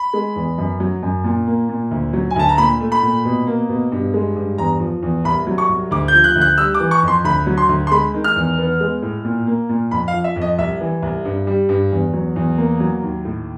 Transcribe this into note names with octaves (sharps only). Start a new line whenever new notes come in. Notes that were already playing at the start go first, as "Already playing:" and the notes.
Already playing: B5
G#3
E2
F#2
F#3
F#2
A#2
A#3
A#2
D2
F#3
G#5
D2 A5
A#5
A#2 B5
A3
B5
A#2
B2
A#3
B2
G2
G#3
G2
E2 A#5
F3
E2
C2 B5
F#3
C#6
C2
D2 D6
G6
F3
F#6
D2
F#6
G3 E6
D6
E3
C#6
F2
C6
D2 B5
F#3
C6
D2
C6
G#3 B5
D#3
F6
E2
B3
G#3
A2
A#2
A#3
A#2
F2 B5
F5
F3
E5
F2
D#5
C2 E5
E3
C2
G2
G3
G2
E2
F#3
E2
A#3
F#3
D#2
A2